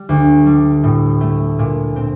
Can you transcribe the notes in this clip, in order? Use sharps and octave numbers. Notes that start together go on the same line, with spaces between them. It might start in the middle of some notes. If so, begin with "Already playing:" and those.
Already playing: G3
D2
G3
A2
A3
A#2
C4